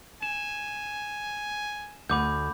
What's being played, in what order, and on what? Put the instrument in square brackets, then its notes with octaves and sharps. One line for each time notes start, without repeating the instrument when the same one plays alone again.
[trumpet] G#5 [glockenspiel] E7
[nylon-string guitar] D2 [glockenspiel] B5 D6 G6